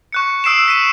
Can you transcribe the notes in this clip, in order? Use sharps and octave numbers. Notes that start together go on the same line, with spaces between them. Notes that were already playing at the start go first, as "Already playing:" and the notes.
C#6 F#6 C#7
D#6 E6 C7 D7 E7
B6 D#7